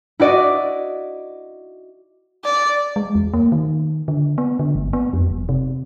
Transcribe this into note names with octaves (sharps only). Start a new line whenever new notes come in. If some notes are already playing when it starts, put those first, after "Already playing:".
E4 F#4 D5 D#5
D5
G#3
E2
A#3
D#3
D3
B3
D3
G1
B3
F2
F1
C3